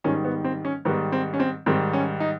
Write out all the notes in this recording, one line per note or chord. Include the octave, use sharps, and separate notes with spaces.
G#2 D#3 G3 C#4
B3
C4
C#4
G#2 D#3 G3 B3
C4
C#4
C4
G#2 D#3 G3 C4
C#4
D#4